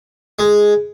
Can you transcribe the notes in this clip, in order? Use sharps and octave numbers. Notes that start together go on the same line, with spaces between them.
G#3